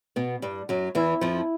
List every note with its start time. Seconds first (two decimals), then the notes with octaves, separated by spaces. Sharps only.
0.16 B2 B3
0.42 G2 G3
0.69 F#2 F#3
0.95 E2 E3 E4
1.21 F2 F3